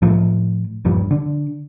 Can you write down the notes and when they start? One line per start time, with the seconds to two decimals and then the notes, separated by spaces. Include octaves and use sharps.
0.02 A2 F3 A3
0.85 D#1 G2 F3 G3
1.11 D3 D4